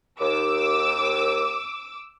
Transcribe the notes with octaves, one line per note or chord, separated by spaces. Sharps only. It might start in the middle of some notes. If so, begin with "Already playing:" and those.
D#2 D6 E6